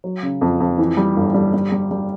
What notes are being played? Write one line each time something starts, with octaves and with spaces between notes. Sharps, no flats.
F#3
C#3
F2
F2
E3
G3
G1
G3
G3
G3
G3